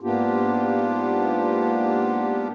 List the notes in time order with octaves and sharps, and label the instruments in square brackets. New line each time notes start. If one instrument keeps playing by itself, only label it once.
[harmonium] G#2 A#3 B3 D4 F4 G4